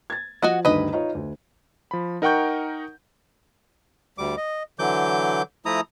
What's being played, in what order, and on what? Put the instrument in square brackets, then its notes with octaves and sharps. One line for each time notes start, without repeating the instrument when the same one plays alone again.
[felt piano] G#6 A6
[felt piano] F3 [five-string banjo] F#4 D#5 F#5
[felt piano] D2 G2 D#3 [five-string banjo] B4 D#5
[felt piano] D#4 F4 C#5
D2
[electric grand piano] F3 B5
D#4 A#4 F#5 G5 C#6 G6
[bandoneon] D2 G3 D6
D#5
D3 E3 F#3 D6 G6
F3 A3 E4 A#5 D#6